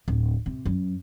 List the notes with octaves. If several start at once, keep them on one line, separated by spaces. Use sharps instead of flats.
D1
C3
F#2